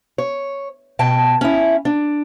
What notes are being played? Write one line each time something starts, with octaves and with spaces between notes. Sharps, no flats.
C#5
B2 G5 A5
C#4 E4
D4